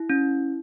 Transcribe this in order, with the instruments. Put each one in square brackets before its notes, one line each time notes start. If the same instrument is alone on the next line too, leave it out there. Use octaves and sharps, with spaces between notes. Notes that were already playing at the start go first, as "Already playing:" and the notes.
Already playing: [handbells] E4
C#4